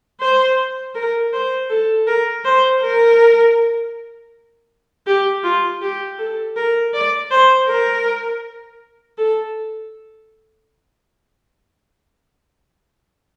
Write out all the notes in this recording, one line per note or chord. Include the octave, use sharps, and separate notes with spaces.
C5
A#4
C5
A4
A#4
C5
A#4
G4
F4
G4
A4
A#4
D5
C5
A#4
A4